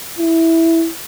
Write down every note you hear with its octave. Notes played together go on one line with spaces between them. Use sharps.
E4